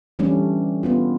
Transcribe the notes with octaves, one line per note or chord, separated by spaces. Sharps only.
E3 G3 A3 C#4 D4
B3 D4 F4